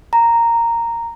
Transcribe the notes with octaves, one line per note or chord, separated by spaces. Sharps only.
A#5